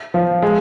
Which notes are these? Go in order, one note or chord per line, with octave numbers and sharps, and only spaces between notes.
F3
G#3